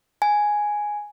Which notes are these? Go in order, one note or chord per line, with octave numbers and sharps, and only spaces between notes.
G#5